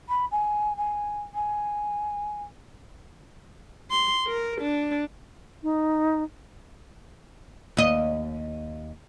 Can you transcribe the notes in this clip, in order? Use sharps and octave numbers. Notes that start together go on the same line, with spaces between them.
B5
G#5
G#5
G#5
C6
A#4
D4
D#4
D#2 D#5